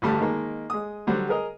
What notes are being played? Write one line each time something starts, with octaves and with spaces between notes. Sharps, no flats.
A1 D2 G2 G3 A3 A5
D#3 G#3 A#3
G#3 D#6
D3 F#3 G3 C5
G#4 A#4 D#5